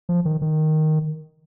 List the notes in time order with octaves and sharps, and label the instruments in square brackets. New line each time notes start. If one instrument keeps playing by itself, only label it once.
[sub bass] F3
D#3
D#3